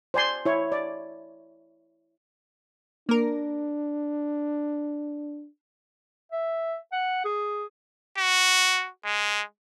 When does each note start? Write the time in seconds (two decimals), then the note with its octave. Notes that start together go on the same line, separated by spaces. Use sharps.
0.14 C5 D5 G#5 C6
0.45 E4 C#5
0.72 D5
3.09 A#3 D4 A#4
6.32 E5
6.92 F#5
7.24 G#4
8.18 F#4
9.05 G#3